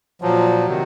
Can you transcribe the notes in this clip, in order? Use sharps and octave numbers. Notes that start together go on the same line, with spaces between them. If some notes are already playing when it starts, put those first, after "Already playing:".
A#2 F3 F#3
C3 D#3